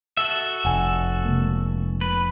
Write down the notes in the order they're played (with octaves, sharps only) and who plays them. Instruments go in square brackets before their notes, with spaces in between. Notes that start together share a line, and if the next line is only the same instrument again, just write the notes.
[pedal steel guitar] F#4 A4 E5
[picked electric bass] F1 [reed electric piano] F#5 G#5
[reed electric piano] C3 G#3 A#3
[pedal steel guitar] B4